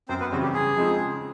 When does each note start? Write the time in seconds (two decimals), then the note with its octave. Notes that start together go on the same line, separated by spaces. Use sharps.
0.09 F#2 C4 C5
0.20 B3 B4
0.32 C#3 E3 G3 C4 F#4
0.43 G4
0.54 C#3 G#4
0.76 F3 G#3 C4 D#4
0.99 C#3